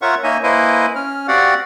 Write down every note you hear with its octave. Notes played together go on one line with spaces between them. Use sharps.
F4 A#4 C#5 E5 F#5 C#6
A#3 D#4 C#5 D#5 E5 G#5
A#3 E4 B4 C5 D#5 G#5
C#4 F6
C4 F#4 G4 D5 F5 F#5